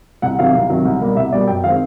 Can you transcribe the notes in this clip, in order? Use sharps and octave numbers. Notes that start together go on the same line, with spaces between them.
C2 F#5
C3 D#3 F#3 F5
C2
C3 D#3 F#3
C2
B2 G3 A#3
C2 E5
B2 G3 A#3 D5
F#2 G5
D#3 G#3 C4 F5